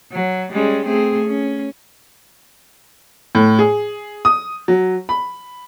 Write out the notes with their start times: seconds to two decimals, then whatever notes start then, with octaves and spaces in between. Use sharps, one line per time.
0.12 F#3
0.52 G3 G#3 C#4
0.85 A3 C4 G#4
1.25 C#4
3.35 A2
3.59 G#4
4.25 D#6
4.68 F#3
5.09 B5